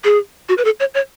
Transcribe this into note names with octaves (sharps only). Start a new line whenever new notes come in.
G#4
F#4
B4
A4
C#5
C#5